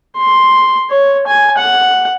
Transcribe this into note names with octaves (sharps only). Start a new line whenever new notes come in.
C6
C#5
G#5
F#5